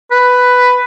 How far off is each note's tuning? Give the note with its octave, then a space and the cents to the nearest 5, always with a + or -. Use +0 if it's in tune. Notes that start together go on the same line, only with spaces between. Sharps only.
B4 +5